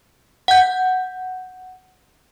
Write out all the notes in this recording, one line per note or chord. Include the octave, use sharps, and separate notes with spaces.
F#5 G6